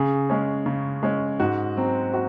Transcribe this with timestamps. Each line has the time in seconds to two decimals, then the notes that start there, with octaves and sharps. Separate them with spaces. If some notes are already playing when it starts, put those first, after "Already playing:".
Already playing: C#3 G#4
0.30 G#3 C#4
0.66 C#3
1.03 G#3 C#4
1.40 G#2 F#4
1.77 F#3 C4
2.14 F#4